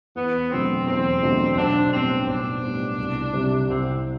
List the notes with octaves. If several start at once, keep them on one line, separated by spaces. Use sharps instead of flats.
E2 B3
B2 F#3 A3 C4 D4
E2 C4
B2 F#3 A3 D4
B1 D4
A2 G3 B3 C4
B1 D4
A2 G3 B3
C2
C3 G3 C4
C2 C4